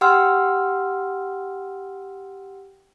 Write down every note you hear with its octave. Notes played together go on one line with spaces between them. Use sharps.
G4 F#5 G5 C6 E6 F6